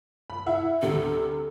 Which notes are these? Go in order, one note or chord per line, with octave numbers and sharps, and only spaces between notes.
B5
E4 E5 F#5
D2 C3 G3 A4